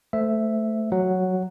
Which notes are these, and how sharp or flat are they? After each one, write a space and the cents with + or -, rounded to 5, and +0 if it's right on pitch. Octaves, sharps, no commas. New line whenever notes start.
A3 +0 C5 -25 E5 +0
F#3 +0 F#5 +0